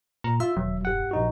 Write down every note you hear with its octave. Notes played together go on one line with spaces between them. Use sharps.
A#2 A#5
F4 E5 E6
E1 D#2 F#3
G2 G4 F#5
A#1 D#4 F#4